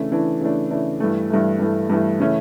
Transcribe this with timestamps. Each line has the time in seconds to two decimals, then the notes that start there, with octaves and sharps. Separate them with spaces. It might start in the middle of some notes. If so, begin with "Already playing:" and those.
Already playing: C#3 E3 A3 D4
0.11 C#3 E3 A3 D4
0.41 C#3 E3 A3 D4
0.71 C#3 E3 A3 D4
1.00 G2 E3 A3
1.30 G2 E3 A3
1.59 G2 E3 A3
1.90 G2 E3 A3
2.20 C#3 E3 A3 C#4